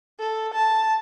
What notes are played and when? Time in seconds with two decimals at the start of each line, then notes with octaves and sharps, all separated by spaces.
0.19 A4
0.54 A5